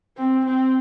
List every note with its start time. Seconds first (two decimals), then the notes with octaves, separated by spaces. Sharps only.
0.17 C4
0.45 C4